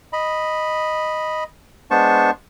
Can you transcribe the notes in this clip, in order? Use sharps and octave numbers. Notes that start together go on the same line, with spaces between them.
D#5 B5
G#3 B3 D4 C5 A5 C#6